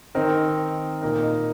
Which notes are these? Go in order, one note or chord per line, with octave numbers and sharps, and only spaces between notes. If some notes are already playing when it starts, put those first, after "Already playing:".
D#3 C4 D#4 A#4
A#2 A#3 D#4 A#4
D#5